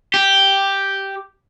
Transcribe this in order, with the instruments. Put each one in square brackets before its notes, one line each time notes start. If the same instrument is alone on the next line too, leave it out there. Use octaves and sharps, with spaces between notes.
[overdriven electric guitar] G4